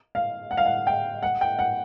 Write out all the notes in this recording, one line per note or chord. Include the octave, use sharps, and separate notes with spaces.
F5
F#5
F5
F#5
G5
F#5
G5
F#5